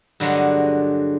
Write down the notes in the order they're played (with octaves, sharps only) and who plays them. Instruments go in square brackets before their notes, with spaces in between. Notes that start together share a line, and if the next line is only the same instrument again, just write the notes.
[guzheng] G2 D3 F#3 G#3